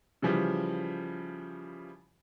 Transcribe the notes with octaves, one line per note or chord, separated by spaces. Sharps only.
C#3 E3 F3 G3